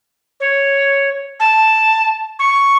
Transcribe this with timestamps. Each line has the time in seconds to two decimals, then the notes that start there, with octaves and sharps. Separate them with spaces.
0.40 C#5
1.40 A5
2.39 C#6